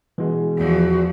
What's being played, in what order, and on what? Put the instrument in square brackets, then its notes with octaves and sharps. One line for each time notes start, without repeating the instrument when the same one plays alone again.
[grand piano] B2 G#3 [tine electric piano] E3
[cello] E2 F3 [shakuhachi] F#4